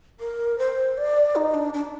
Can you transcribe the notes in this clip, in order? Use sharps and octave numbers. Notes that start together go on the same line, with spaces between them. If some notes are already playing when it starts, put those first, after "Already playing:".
A#4
C5
D5
D#4
D4
D4